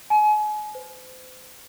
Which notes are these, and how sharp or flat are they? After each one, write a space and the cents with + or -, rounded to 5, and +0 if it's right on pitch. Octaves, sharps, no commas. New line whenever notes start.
G#5 +35
C5 -35